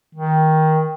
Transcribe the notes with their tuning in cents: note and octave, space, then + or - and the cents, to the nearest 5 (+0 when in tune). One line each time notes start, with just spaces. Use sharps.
D#3 +15